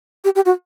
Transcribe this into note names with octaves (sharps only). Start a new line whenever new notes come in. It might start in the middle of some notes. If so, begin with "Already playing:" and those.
G4
G4
F#4